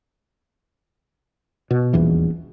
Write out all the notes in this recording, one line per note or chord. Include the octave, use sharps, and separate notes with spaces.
B2
D#1 A#1 E2 E3